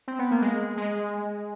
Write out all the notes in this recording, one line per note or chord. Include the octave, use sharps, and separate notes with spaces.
C4
B3
A#3
G#3
G#3